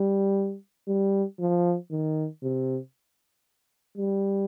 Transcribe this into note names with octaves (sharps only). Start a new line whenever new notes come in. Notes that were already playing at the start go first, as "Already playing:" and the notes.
Already playing: G3
G3
F3
D#3
C3
G3